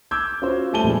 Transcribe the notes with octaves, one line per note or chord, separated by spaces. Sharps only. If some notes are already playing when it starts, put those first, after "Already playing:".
D6 E6 G6 G#6
C#4 F4 F#4 C5
G3 A3 G#5 A5 D#7 G7
A#2 F3 G3 G#3